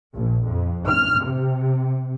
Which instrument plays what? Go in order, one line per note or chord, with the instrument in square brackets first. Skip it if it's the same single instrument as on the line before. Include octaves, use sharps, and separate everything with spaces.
[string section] A#1
F2
F6
C3